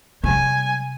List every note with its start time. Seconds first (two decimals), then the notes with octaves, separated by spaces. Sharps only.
0.24 C3 G3 G#5